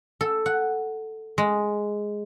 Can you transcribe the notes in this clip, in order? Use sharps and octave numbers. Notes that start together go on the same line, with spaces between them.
A4
F#5
G#3